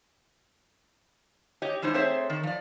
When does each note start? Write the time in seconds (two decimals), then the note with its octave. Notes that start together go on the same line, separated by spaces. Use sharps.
1.62 G4 C#5 D#5
1.82 E3 G#3 D#4 C5
1.94 A3 C4 G#4 C5 C#5 E5
2.30 D#3
2.43 F3 D5